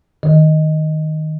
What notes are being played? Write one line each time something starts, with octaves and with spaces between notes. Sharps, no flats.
D#3